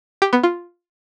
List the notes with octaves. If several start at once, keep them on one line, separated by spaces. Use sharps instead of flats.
G4
B3
F4